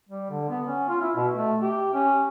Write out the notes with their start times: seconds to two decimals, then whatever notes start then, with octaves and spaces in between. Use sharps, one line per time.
0.09 G3
0.30 D3
0.49 B3
0.67 C#4
0.89 F4
1.02 E4
1.16 B2
1.34 A3
1.61 G4
1.94 C#4